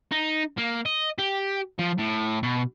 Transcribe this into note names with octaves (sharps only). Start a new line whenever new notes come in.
D#4
A#3
D#5
G4
F3
A2
B2